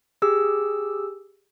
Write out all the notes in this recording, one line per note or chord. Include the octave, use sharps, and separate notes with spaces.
G4 G#4 E6